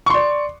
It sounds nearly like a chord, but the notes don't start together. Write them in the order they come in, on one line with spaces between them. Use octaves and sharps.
C#6 C6 D5